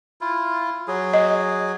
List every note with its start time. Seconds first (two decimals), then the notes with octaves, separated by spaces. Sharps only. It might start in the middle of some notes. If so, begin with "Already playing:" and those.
0.21 E4 F4
0.88 F#3 G#4
1.13 D#5